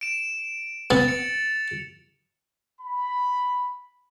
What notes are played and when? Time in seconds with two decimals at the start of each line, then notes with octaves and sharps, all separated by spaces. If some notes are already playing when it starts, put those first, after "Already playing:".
0.01 D7 E7
0.91 B3 A6 F7 F#7
1.08 C#7
2.81 B5